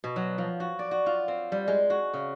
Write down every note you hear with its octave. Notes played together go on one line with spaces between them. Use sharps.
B2
F#3
F3
F#4
D5
F#4
F4
C4
G3
G#3
F#4
C#3